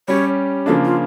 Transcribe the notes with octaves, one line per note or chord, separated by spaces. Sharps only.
G3 C#4 G4 C#5
C#3 F3 A#3 D4 A4
F4